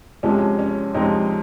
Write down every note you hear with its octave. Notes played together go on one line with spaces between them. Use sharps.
F2 C3 F3 G#3 C#4
C#4
F2 C3 F3 G#3 C4 D#4